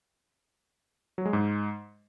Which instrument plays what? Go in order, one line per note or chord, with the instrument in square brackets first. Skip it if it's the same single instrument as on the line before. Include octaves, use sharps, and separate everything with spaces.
[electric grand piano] F#3
G#3
G#2